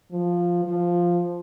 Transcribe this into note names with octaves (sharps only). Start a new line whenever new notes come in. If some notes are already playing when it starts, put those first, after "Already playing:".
F3
F3